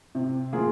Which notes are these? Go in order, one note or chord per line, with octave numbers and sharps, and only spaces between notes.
C3
F3 A#3 F4 G#4